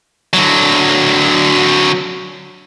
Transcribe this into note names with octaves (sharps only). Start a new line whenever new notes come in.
D3 F#3